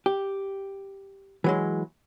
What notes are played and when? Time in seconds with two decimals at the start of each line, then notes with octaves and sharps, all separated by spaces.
0.06 G4
1.44 E3 F#3 G#3